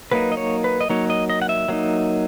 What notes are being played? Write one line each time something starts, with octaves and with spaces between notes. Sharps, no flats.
F#3 A#3 D#4 B4
D#5
C#5
B4
D#5
F#3 A#3 D#4 C#5
D#5
D#5
F#5
E5
F#3 A#3 D#4